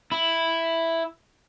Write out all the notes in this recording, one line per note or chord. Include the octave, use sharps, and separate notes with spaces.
E4